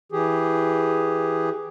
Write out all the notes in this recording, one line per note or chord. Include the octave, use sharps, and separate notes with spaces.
E3 G4 G#4